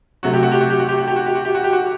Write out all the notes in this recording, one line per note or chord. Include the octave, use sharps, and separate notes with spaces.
C3 F#3 A3 F#4
G4
F#4
G4
F#4
G4
F#4
G4
F#4
G4
F#4
G4
F#4
G4
F#4
G4
F#4